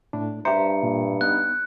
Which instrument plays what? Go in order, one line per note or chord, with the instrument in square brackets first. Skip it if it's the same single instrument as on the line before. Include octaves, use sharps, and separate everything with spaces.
[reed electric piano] A2 D4
[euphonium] G2 [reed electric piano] G4 C5 [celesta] E5 A#5 [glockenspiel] C#7
[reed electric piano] A#2
[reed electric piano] B3 D#4 [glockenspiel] F#6